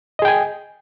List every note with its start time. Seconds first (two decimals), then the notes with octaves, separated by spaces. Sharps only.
0.19 D#5
0.22 G#4
0.25 G5
0.28 G#5